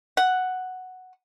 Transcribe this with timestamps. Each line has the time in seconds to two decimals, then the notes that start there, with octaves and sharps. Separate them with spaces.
0.17 F#5